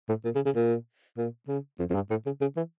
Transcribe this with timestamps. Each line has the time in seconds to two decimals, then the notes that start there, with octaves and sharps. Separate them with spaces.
0.09 A2
0.24 A#2
0.35 C#3
0.45 C#3
0.55 A#2
1.18 A#2
1.48 C#3
1.79 F2
1.90 F2
1.95 G2
2.10 A2
2.26 C#3
2.41 C#3
2.57 E3